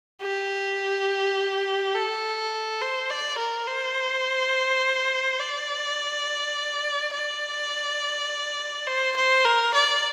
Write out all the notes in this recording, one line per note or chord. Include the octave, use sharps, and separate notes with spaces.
G4
A4
C5
D5
A#4
C5
D5
D5
C5
C5
A#4
D5